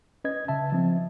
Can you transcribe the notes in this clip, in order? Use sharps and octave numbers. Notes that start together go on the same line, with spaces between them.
C#4 B4 D#5 G#6
C#3 E5 A5
F3 C4